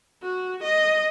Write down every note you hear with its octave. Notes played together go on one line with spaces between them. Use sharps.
F#4
D#5